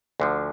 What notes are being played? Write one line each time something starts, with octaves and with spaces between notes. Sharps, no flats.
D2 D3 F3